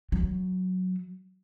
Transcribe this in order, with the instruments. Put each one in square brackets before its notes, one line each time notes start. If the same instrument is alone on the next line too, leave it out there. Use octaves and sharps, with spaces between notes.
[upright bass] F#3